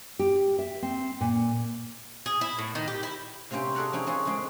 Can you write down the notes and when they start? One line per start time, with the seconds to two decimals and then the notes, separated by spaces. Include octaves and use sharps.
0.19 G4
0.59 E5
0.82 C4
1.21 A#2
2.26 G#4
2.41 E4
2.58 A2
2.75 D#3
2.88 G4
3.03 E4
3.51 C3 A#3 C4 C#4 G4
3.75 F#4 G#4 A4 D5 F#5 A#5
3.93 C4 C#4 D#4 E4
4.06 A#3 C#4 F#4 G#4 A4
4.26 C#3 G#3 C4